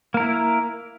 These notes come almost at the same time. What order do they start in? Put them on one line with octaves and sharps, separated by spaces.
A#3 A#4 E4